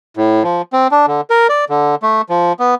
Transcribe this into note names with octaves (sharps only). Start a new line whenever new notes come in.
A2
F3
C4
D4
D3
A#4
D5
D3
A3
F3
B3